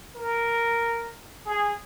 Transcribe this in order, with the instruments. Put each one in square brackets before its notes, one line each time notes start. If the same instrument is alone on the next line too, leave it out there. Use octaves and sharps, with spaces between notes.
[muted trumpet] A#4
G#4